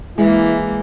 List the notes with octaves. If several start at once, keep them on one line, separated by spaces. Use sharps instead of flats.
E3 G#3 A#3 E4